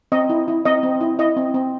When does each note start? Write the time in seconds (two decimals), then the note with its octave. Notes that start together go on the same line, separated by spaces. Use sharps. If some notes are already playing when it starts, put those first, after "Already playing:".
0.12 C4 D#5
0.29 E4
0.48 E4
0.65 C4 D#5
0.83 C4
1.01 E4
1.19 E4 D#5
1.37 C4
1.54 C4